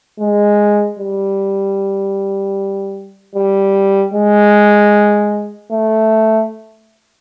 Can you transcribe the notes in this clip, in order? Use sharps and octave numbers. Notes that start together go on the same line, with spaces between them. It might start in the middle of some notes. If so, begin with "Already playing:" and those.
G#3
G3
G3
G#3
A3